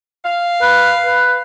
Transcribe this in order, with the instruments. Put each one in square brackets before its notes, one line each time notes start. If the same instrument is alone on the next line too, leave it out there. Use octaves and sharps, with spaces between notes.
[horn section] F5
[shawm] B4
B4